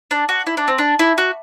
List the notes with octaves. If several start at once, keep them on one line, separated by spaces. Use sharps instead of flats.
D4
F#4
E4
D4
C4
D4
E4
F#4